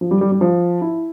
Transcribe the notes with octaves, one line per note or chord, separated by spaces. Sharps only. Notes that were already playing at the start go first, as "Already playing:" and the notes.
F3
G3
G3
G3
F3
E4